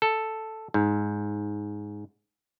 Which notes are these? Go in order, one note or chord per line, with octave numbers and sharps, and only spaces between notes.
A4
G#2